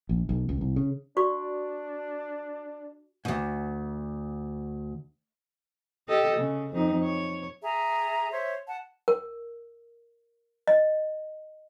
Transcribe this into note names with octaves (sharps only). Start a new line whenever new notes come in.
A#1
B1
C#2
C2
C#3
D4 F#4 D5 C#6
D2 G#2
G4 A4 D#5
C#3
F2 D#4
C#5
G#4 E5 A#5
C5 C#5 E5
F#5 A5
A#4
D#5